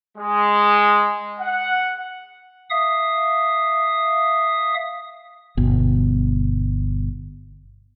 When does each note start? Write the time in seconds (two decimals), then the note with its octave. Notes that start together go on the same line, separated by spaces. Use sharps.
0.18 G#3
1.40 F#5
2.70 E5 F5 D#6
5.57 G1 B2